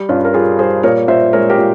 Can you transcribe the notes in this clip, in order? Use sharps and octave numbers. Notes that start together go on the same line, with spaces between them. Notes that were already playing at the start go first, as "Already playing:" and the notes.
Already playing: G3
G2 C#4 F4
A#4
G3 F4 G#4
G3 G#4 C5
A#2 A#4 C#5
A#2 C5 E5
G#3 A#4 C#5
G4 A#4
A#2